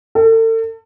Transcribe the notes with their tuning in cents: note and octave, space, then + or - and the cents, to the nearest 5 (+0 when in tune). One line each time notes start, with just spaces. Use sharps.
A4 +35